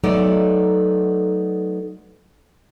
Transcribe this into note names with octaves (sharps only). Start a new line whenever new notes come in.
F#3 A3 B3 D#4 A4 D5